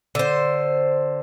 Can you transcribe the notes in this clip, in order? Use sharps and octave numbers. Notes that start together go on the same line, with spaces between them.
D3 C5